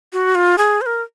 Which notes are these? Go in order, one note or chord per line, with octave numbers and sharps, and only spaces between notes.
F#4
F4
G#4
C5
A#4